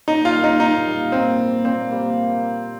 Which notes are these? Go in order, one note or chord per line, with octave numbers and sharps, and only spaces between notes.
A#2 D#4
F4
G3 A#3
D#4
A#2 D#4
G3 A#3
A#2 C4
G3 A#3
A#2 C4
G3 A#3